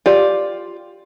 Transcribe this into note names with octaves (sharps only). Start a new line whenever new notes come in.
F4 G4 D5